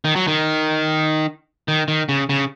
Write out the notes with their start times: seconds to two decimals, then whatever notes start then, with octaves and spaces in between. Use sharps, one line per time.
0.05 D#3
0.16 F#3
0.28 D#3
1.68 D#3
1.88 D#3
2.09 C#3
2.29 C#3